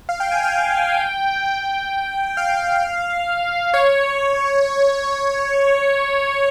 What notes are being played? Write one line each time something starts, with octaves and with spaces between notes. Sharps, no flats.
F5
G5
G#5
G5
G5
F5
C#5